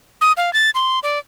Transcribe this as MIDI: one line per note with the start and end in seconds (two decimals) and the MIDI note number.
0.21 0.32 87
0.37 0.53 77
0.53 0.70 93
0.75 0.99 84
1.03 1.19 74